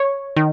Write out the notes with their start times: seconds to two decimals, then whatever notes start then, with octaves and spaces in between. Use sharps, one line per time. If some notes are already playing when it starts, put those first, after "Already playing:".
Already playing: C#5
0.37 D#3